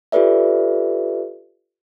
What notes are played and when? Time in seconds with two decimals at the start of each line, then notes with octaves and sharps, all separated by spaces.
0.12 F4 G4 A4 B4 D5 E5